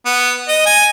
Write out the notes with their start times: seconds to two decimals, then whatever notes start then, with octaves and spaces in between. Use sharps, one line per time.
0.06 B3
0.48 D#5
0.66 G#5